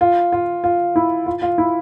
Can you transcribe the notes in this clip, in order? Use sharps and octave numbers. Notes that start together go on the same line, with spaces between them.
F4
F4
F4
E4
F4
F4
E4